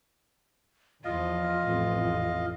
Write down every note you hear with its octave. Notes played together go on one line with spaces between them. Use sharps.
E2 F3 F4 D#5 F5
A1 F2 E3